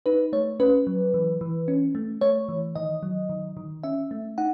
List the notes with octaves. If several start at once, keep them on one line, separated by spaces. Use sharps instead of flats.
D#4 B4
A3 C#5
C#4 B4
F#3
E3
E3
C#4
A3
A3 C#5
E3
D#3 D#5
F#3
D#3
D#3
C#4 E5
A3
D#4 F#5